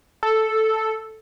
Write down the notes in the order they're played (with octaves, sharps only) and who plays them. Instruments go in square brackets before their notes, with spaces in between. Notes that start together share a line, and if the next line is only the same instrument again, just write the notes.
[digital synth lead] A4